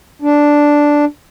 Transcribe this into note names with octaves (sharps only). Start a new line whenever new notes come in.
D4